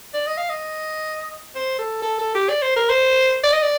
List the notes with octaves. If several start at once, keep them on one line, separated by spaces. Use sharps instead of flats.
D5
D#5
F5
D#5
C5
A4
A4
A4
G4
D5
C5
A#4
C5
D5
D#5
D5